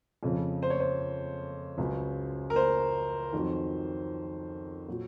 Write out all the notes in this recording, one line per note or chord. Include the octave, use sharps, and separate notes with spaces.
F2 C#3 F3
C5
C#5
C5
C#2 C#3 F#3
A#4
C5
F2 D#3 F#3
A#2 F#3